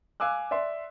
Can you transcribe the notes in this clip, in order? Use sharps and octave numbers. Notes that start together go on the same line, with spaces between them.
F5 G#5 D6 E6 F#6
D5 E5 C6